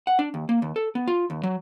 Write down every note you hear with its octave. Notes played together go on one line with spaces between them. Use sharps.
F#5
D4
D#2
A#3
D#2
A4
B3
F4
D#2
F#3